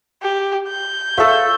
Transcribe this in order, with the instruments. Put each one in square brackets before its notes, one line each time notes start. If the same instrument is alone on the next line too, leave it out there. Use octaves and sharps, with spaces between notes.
[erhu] G4
G6
[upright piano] F4 E5 [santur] A4 C#5